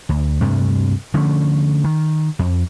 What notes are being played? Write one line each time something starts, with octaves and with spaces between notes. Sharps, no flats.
D2
D2 G2 C3 A3
D3 F3 A3 C#4
D#3
F2